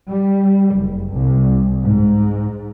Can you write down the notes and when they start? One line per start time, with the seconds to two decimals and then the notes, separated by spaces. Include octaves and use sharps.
0.10 G3
0.76 F#1
1.14 C2
1.82 G#2